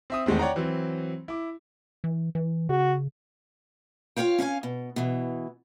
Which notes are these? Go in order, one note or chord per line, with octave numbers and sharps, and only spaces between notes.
C4 E5 D#6
E2 D#3 G#3 A3 C4
C#5 D5 F#5 G5 A#5
E3 F#3 C4
E4 D6
E3
E3
C#3 F#4
F4 F#4 C#5 F5 G5
C#4 F5 F#5 G#5
B2
B2 E3